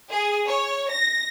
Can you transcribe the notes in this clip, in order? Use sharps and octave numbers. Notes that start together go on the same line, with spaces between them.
G#4
C#5
A#6